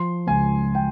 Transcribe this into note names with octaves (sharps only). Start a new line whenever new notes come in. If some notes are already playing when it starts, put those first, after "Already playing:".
Already playing: F3 C6
C#2 G#5
G5